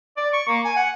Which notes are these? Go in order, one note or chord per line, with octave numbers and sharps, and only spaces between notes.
D5
C#6
A#3
G#5
F#5